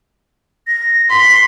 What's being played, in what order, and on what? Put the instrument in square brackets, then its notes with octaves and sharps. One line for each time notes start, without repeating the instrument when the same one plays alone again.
[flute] A#6
[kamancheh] C6 [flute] B6